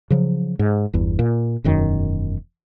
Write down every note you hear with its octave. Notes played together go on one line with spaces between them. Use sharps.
C#3 F3 F#3
G#2
G1 E2
A#2
E1 F#2 D#3